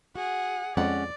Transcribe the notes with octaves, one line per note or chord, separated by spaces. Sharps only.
F#4 G#4 F#5
F2 G#3 C#4 D5 F#5